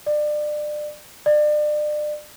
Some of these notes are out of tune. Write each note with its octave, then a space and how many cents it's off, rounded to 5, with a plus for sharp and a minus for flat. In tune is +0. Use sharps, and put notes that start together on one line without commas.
D5 +30
D5 +35